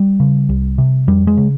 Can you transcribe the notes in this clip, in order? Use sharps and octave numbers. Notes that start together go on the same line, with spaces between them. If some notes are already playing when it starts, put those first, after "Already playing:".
Already playing: G3
C#3
C2
C3
F2 G3
G#3
C#3